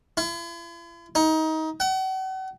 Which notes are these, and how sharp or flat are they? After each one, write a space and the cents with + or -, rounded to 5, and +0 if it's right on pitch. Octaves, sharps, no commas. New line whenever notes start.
E4 +45
D#4 +25
F#5 +40